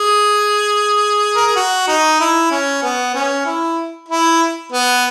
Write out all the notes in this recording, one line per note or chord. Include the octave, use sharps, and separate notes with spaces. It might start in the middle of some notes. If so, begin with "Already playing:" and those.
Already playing: G#4
A#4
G#4
F#4
D#4
E4
C#4
B3
C#4
E4
E4
B3